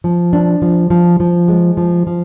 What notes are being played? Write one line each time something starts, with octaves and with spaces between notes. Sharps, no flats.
F3
D4
F3
F3
F3
G#3
F3
F3